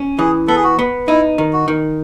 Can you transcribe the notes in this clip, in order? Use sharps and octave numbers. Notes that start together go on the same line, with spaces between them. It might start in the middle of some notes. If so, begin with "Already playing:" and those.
Already playing: C#4
E3 G#4
B3 A4
G#4
F#4
B3
D#4 E4
D#3
F#4
D#3